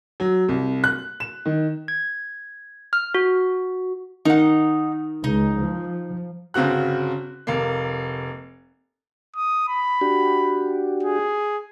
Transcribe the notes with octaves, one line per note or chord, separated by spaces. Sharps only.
F#3
C2
F#6
E7
D#3
G#6
F6
F#4
D#3 D#4 F#5
C#2 D#4
F3
G1 C#3 C4 F#4 F#6
F1 A#3
D#6
B5
D4 F#4 G4
G#4